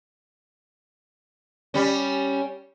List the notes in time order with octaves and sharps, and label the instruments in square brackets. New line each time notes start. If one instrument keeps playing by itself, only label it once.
[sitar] G3 C#4